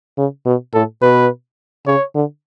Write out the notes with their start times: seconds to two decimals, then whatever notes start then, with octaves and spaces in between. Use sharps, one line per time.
0.18 C#3
0.46 B2
0.74 A2 A4
1.02 B2 B4
1.86 C#3 C#5
2.15 D3